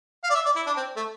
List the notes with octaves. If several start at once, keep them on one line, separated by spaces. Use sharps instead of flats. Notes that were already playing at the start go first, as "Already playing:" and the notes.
F5
D5
E5
D5
E4
D4
C4
A3